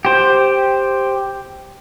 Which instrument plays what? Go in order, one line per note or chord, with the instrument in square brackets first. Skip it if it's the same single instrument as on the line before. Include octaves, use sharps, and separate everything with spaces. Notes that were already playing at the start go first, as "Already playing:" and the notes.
[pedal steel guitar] G4 C5